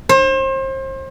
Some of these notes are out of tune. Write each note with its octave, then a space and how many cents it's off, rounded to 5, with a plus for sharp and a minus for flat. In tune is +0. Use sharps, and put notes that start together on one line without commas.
C5 +35